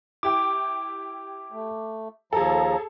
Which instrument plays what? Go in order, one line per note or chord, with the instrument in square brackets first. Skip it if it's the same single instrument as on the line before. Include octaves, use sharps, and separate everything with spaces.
[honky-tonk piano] E4 G4 G5 [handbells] D6
[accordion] A3
[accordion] D#2 F3 A#5 [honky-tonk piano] G#4 A4